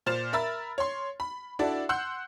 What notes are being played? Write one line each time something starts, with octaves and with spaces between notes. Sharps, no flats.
A#2 C5 F6 A6 E7
A#4 E5 B5 E6 A6
C#5 C6
B5
D4 E4 F#4 A4 D5
F#5 C6 E6 F#6 G6 F#7